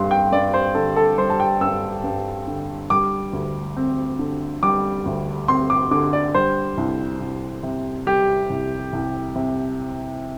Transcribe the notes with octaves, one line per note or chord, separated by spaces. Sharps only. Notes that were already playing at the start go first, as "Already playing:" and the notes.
Already playing: G2 G3 C6
G5
G2 D5
C5
D3 A4
A4
G3 C5
A5
G5
G2 E6
G2
D3
G3 D6
D2
C4
D3
G3 D6
D2
C4 C6
D6
D3 D6
D5
G3 C5
C2
C2
C3
G3 G4
C2
C2
C3